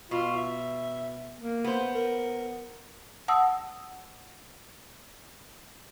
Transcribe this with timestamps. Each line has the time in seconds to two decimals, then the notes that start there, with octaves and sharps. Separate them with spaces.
0.11 B2 F4
0.37 E5
1.41 A#3
1.64 B3 C5
1.94 A#4
3.28 F#5 A5 D#6 E6